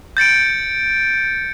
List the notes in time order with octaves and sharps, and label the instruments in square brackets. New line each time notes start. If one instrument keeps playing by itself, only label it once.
[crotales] G6 A6 C#7 D7